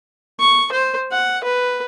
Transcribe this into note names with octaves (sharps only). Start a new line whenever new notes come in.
C#6
C5
F#5
B4